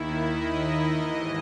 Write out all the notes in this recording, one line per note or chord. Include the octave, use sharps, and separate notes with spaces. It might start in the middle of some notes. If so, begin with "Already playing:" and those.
Already playing: D#2 D#3 E4
D#5
D#5
G#2 E3 D#5